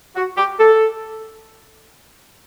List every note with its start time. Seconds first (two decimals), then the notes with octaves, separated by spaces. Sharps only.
0.16 F#4
0.37 G4
0.59 A4